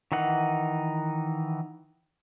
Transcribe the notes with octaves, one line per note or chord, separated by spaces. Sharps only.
D#3 E3 D#4 F#5